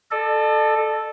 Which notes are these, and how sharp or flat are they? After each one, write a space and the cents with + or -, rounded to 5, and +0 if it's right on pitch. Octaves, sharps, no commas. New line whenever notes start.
A4 -5 D5 +45